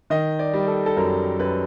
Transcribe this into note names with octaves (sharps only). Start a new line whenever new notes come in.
D#3 D#5
D5
G3
A4
A4
F#2 A#4
F#2 B4